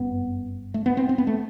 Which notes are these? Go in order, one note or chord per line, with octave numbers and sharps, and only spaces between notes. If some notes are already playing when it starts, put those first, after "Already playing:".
Already playing: G1 F#2 B3
A3
B3
C4
C4
B3
A3